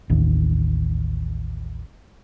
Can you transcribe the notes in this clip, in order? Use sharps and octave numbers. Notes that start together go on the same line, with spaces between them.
A1 D#2